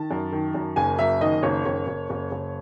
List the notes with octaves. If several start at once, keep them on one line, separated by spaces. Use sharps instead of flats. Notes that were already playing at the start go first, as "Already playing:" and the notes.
Already playing: D#3 A5
F#2
D#3
F#2
F#1 G#5
F#2 E5
D#3 D#5
F#1 C#5
F#1 C#5
F#1
F#1
F#1